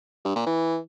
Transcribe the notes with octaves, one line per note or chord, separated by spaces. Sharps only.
G2
A#2
E3